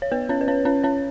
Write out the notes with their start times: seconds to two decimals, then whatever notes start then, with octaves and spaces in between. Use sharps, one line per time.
0.02 C#5
0.12 B3 B4
0.29 C#4 C#5
0.41 B4
0.48 C#4 C#5
0.65 C#4 C#5
0.84 C#4 C#5